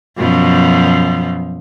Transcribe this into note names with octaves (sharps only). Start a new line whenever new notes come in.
F#2 B2 F3